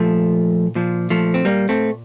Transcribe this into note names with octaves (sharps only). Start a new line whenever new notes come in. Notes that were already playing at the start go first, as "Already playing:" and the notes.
Already playing: A#2 F3 A3
A#2 F3
F3 A3
C4
G3 A#3
A3 C4